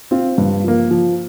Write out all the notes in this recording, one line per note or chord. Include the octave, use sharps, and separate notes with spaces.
C4 F4
G2
F3 A#3
F3